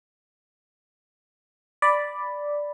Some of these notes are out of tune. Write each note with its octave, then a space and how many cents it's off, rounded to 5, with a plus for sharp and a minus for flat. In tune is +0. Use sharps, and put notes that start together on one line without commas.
D5 +0 B5 +0